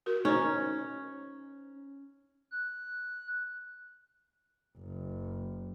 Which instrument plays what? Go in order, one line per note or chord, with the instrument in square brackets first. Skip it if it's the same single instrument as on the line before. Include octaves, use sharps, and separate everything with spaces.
[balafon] F#4 A#4
[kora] C#4 [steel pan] D#4 [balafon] C5 C#5
[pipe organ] F#6
[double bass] F#1